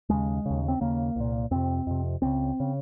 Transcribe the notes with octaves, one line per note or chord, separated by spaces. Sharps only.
D#2 C#3 G#3
D#2 C#3
C4
D#2 C#3 A#3
C2 A#2
F2 C3 C4
F2 C3
C#2 C#3 C4
C#3